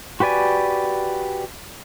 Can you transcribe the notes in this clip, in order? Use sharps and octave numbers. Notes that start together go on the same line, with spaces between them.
F#4 G4 B4 D5 G#5